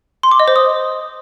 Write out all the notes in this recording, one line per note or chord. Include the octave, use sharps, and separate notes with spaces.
C6
D6
D#5
C5
D#6